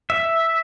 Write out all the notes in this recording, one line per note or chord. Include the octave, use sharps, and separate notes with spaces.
E5